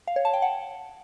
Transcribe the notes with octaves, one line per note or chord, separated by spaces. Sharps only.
F5
C#5
A5
G5
F#5